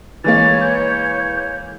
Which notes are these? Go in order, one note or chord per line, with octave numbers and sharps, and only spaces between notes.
E3 G#3 A#3 B4 C#5 A6
G6